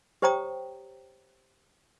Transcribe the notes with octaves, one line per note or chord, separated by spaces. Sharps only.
G4 C5 C#5 G5 A#5 D#6